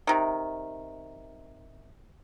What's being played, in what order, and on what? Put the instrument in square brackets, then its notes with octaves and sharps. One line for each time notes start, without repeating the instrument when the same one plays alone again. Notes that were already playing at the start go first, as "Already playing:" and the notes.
[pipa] C3 D#3